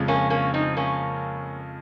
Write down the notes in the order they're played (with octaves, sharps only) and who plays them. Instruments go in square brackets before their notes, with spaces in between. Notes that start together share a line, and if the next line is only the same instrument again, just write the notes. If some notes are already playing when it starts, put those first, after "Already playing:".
Already playing: [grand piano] F2 C#3 F3 G#3
[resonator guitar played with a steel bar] A#3 C#4
A#3 C#4
C4 D#4
A#3 C#4